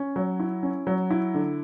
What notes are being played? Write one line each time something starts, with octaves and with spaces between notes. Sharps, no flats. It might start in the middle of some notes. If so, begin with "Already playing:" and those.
Already playing: C#4
F#3
E4
C#4
F#3
E4
D3